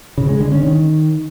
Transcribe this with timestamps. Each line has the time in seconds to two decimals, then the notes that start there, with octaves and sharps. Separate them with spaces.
0.18 C#3
0.29 G#3
0.40 D3
0.52 C#4
0.63 D#3